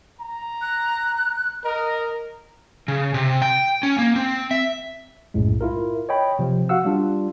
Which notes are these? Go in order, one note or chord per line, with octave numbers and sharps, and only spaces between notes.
A#5
F#6
A#4 D#5
C#3
C3
G5
C#4
A#3
C4
E5
B1 F#2 A2 G#3
E4 F4 A#4
C#5 D#5 G5 B5
C3 F3
F#4 F5 F#5 E6
G3 D4 F4